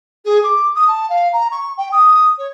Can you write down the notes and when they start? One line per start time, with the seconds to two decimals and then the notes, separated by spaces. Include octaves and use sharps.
0.25 G#4
0.43 D6
0.75 D#6
0.87 A5
1.10 F5
1.33 A#5
1.51 C#6
1.77 G5
1.92 D#6
2.38 C#5